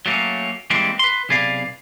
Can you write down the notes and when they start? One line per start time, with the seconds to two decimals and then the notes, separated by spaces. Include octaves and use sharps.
0.06 F#3 A3 A#3 C4 C#4
0.70 E3 G3 G#3 A#3 C4
0.99 B4 C6
1.29 B1 C3 G#4 B4 D5 F5